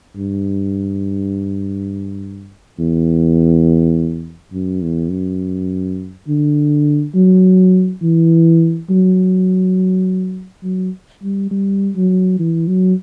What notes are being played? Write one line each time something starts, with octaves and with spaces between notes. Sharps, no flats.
G2
E2
F#2
E2
F#2
D3
F#3
E3
F#3
F#3
G3
G3
F#3
E3
F#3